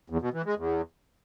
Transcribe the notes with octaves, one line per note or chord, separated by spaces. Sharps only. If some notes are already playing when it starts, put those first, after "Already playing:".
E2
B2
E3
G#3
E2